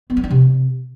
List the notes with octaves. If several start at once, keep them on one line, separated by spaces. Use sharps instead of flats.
B3
F#3
D4
C3